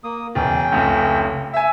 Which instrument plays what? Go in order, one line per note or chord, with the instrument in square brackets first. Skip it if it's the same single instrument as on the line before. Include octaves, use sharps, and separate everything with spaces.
[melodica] A#3 D#6
[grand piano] E1 [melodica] C#4 G5
[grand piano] F1 C#2
[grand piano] E5 G#5 [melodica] E6